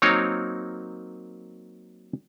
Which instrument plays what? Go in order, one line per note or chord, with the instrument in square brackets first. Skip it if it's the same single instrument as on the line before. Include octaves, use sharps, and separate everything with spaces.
[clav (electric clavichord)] F#3 A#3 C4 D#4 A#4 C#5